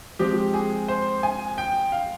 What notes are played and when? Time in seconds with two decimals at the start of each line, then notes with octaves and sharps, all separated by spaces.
0.19 F3 G#3 C4 G4
0.54 G#4
0.88 C5
1.23 G#5
1.58 G5
1.92 F5